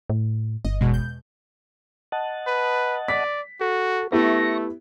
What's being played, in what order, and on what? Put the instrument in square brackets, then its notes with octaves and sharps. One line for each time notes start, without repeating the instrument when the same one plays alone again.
[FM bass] A2
[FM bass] G1 [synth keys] D#5
[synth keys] E2 B2 G#3
G6
[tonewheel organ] D#5 F#5 A5
[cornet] B4
[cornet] D5 [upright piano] B6
[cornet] F#4 [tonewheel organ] A4
[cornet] A3 [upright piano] B3 E4 G4 [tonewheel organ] C#6 A#6